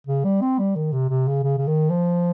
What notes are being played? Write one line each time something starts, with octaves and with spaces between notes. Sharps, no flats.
C#3
G3
C4
G3
D#3
C3
C3
C#3
C#3
C#3
D#3
F3